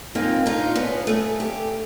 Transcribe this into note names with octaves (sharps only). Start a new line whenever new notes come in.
G#2 A#3 C4 D#4 F4
D4 D#4 F4
B3 C#4
A3 G#4
G4